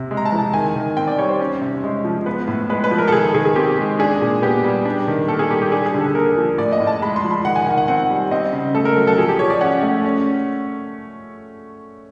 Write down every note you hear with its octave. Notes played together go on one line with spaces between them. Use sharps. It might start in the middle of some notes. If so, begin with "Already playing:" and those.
Already playing: C3 C4
G#3
A#5
A5
E3
A5
D#3 G#5
D#3
C4 G5
D5
G3 C#5
C5
C#4
C3
G#3
F3
B3 B4
A2
G#3 B4
B4
F3
A#4
A4
D#3 G#4
D#3 G#4
G#4
C4 G4
G#3
D4 G#4
A#2
B3 G4
G3
D4
D#3
A#3 A4
G#4
G3 G4
G4
D4 G#4
G#4
D3
A4
A#3 A#4
F3
A2 D5
D#5
A2
A5
G#3 B5
C6
F3
B5
D#3 F#5
G#5
D#3 F#5
F#5
C4 F#5
G3
C4 D#5
C#3
A3 A4
A#4
F#3
A4
F3 G#4
G4
F3 C#5
D5
C#4 F#5
A3
C#4